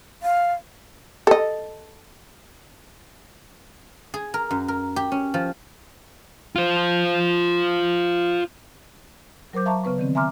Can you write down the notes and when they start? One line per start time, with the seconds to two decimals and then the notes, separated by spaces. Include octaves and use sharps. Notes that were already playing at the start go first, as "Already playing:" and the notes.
0.22 F5
1.27 A4 D#5
4.14 G#4
4.34 A#4
4.51 F#2
4.68 A#4
4.96 G4
5.12 C#4
5.34 F3
6.56 F4 C5
9.53 F#3 A#4 C5 D6 G6
9.66 E5 F5 A5 A#5 C#6
9.84 C#3 B3 B4 C#6
9.98 D3 D#3 B3 C4
10.15 E5 G#5 A#5 C6 D6 F6